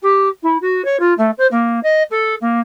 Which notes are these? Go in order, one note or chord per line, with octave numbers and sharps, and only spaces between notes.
G4
E4
F#4
C#5
F4
A3
C5
A#3
D#5
A4
A#3